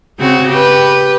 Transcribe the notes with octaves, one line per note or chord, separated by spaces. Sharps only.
C#3 C4 F#4
G4 B4